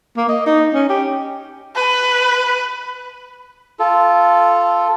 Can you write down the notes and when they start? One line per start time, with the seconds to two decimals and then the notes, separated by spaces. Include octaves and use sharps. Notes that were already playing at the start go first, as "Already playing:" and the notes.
0.17 A#3
0.29 D#5
0.46 D#4
0.74 C#4
0.89 G4
1.76 B4
3.79 F4 A4